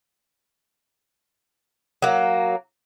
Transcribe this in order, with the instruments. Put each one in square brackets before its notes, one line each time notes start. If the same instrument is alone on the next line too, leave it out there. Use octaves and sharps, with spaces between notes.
[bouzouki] F#3 A#3